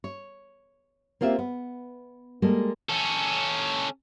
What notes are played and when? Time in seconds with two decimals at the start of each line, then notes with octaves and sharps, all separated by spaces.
0.04 C#5
1.21 A#3 C4 F4 G4 E5
1.39 B3
2.42 G3 G#3 A#3 A4
2.89 C#4 A4